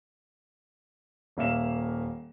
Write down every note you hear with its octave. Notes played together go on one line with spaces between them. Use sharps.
D#1 A#3 E5 F5 E7